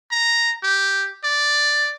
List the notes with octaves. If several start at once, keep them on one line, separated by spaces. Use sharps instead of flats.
A#5
G4
D5